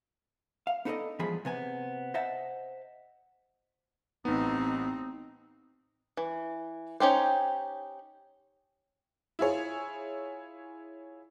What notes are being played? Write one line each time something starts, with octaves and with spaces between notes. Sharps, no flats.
F5
B3 D#4 A4 B4 D5 D#5
E2 G#2 F3 G3 G#4 B5
C3 B3 G#5
C5 D#5 E5 F#5 A5
A1 B3 C4 D#4
E3
C#4 D#4 G4 C5
E4 F4 G#4 C#5